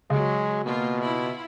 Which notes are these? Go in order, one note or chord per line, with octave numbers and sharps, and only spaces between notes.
C#3 F#3 G#3
B2 A#3 F4
E4 F4 B5